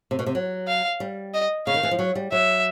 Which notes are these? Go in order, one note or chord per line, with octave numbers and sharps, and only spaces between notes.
C3
B2
C3
F#3
F5
G3
D#5
C#3 F5
D#3
E3
F3
F#3
G3
F#3 E5